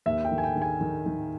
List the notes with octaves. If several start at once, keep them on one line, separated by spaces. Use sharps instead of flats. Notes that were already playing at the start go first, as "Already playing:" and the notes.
D#2 E5
G5
D#3
G#5
G5
D#3
G#5
D#3
D#3